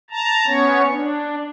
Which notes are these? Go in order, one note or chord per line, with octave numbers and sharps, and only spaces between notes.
A5 A#5
B3 C#4 C#5
D4